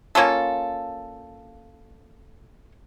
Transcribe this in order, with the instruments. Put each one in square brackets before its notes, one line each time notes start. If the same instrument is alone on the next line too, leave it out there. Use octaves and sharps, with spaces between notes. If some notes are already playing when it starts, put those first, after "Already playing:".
[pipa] A#3 C#4 F4 A4